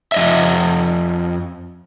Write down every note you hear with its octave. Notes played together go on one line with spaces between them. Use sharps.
F2 D#5 E5